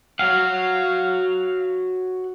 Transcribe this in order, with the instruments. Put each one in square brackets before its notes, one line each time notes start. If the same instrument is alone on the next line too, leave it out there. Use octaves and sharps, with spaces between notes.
[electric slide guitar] F#4 C#5 F#5 [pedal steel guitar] F5